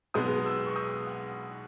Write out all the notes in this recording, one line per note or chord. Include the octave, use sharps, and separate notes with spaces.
B1 B2 G#3 B3 D#6
E6
C#6
D#6
F#5